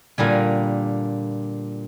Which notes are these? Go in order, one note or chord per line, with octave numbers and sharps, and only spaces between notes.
A#2 D3 G3 G#5